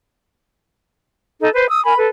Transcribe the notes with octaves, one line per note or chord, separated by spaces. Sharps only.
D#4 A4
B4 C5
D#6 E6
A#4 G#5 B5
A4 B4